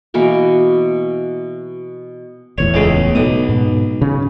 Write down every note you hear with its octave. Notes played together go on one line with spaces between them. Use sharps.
B2 E3 A#3 F#4
D1 E2 A2 C#5
C#2 C#3
B1 B3 D#6
G#2 B2
C#3